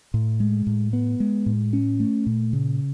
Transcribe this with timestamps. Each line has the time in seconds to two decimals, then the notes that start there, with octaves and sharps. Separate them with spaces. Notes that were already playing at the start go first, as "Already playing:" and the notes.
0.14 A2
0.40 G#3
0.67 A2
0.93 B3
1.20 G#3
1.46 A2
1.73 C#4
2.00 A3
2.26 A#2
2.53 C#3